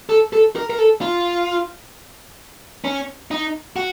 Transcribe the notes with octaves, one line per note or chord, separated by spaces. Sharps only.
A4
A4
A#4
A#4
A4
F4
C#4
D#4
F#4